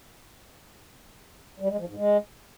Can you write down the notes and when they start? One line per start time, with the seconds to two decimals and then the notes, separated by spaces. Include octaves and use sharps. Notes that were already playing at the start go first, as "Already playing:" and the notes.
1.60 G3
1.69 G#3
1.78 F3
1.87 G#2
1.96 G#3